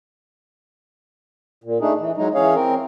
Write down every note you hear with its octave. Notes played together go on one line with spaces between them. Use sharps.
A#2
A3 D4 D#4 G#4
E3
F#3 G#3 D#4
E3 C#4 G#4 C#5 F5
C4 A#4